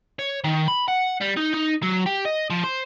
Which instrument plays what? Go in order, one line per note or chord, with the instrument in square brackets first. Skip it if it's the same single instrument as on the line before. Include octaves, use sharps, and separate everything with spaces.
[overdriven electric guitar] C#5
D#3
B5
F#5
G3
D#4
D#4
F#3
G4
D#5
F3
C5